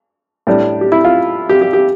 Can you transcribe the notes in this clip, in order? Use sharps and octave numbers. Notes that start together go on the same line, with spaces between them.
A2 G3 D4
G4
E4
F4
G4
G4
G4